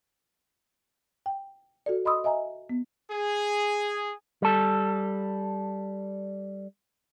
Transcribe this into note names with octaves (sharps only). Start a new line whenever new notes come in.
G5
F#4 A4 D5
D#5 B5 C6 D#6 E6
D#5 E5 G#5 A#5
B3
G#4
G3 A4